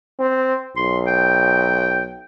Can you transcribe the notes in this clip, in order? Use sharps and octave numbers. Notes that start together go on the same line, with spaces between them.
C4
B1 C6
G5